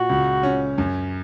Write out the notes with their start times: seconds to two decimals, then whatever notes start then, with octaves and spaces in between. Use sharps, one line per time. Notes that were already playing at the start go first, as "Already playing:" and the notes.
Already playing: A#2 F#4
0.09 C#2
0.43 C#4
0.78 F#2